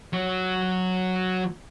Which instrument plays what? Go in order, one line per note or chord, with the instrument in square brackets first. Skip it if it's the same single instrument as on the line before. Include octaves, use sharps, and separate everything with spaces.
[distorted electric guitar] F#3